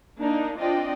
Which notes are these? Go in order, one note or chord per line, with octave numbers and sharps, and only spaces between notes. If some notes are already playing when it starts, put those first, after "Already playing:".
A#3 D4 D#4
C4 D4 F4 D5 D#5 G5